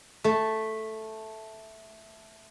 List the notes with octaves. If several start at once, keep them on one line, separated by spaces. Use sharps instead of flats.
A3 A5